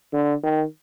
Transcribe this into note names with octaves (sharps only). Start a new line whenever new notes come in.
D3
D#3